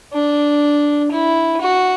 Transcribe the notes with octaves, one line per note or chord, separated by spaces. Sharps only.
D4
E4
F#4